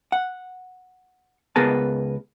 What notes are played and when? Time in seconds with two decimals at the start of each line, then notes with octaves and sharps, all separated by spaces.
0.12 F#5
1.56 C#2 B3 G#4 A#4 B4 A5